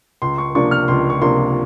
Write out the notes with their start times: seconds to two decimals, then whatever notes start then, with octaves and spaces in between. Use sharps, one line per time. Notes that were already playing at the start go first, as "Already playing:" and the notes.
0.22 C#2 C6
0.38 C#6
0.55 C3 F3 A#3 D4 C#6
0.71 F6
0.88 C#2 C6
1.10 C#6
1.21 C3 F3 A#3 D4 C6